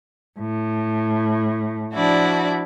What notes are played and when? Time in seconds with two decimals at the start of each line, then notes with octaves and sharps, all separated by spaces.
0.39 A2
1.93 F3 D4 E4 F#4 D5